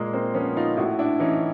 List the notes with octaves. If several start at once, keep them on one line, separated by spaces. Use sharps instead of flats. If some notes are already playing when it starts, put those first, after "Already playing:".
Already playing: A#2 G#3 A#3
A#3 C4
F3 B3 C#4
D#4 F4
A2 E4 F#4
D4 E4
E3 C#4 D#4